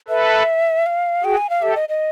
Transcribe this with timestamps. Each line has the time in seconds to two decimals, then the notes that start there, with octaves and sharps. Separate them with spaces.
0.08 A4 B4 E5
0.86 F5
1.24 F#4 G#4 G5
1.37 G#5
1.50 F5
1.62 G4 A4 E5
1.76 D#5
1.89 D#5